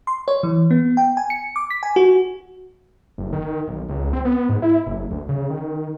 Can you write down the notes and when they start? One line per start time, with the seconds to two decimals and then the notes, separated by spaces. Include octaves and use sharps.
0.07 C6
0.28 C#5
0.43 E3
0.71 B3
0.97 G5
1.17 G#5
1.30 C#7
1.56 D6
1.70 B6
1.83 G#5
1.96 F#4
3.18 F#1
3.33 D#3
3.68 B1
3.89 C#2
4.13 C4
4.25 B3
4.49 G#2
4.62 E4
4.87 F#1
5.11 D2
5.29 C#3
5.50 D#3